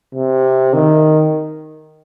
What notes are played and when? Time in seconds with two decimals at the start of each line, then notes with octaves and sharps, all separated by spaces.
0.15 C3
0.73 D#3